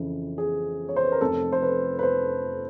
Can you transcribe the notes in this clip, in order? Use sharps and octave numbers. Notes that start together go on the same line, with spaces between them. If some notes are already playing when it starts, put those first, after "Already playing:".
Already playing: F2 C#3 E3
G#4
C#5
C5
B4
A#4
F1 F2 C3 A4
C5
B4
B4
C5